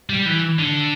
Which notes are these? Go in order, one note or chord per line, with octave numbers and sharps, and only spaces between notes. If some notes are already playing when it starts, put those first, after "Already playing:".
G3
E3
D3